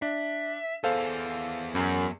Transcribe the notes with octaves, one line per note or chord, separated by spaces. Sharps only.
D4 E5
B3 G#4 A4 C5 F5
F#2